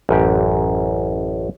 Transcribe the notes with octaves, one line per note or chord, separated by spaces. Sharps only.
A1 F#2 G4